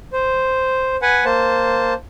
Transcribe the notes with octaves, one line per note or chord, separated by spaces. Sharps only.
C5
B4 F#5 G#5
A#3 C5 A5